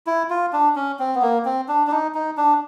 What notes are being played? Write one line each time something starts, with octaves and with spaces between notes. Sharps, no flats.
E4
F4
D4
C#4
C4
B3
A#3
C4
D4
D4
D#4
D#4
D4